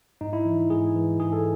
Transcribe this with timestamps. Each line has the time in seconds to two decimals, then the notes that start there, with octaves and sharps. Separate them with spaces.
0.21 G#2 D#4
0.33 E4
0.45 E3
0.70 G#2 G#4
0.95 E3
1.20 G#2 G#4
1.33 A4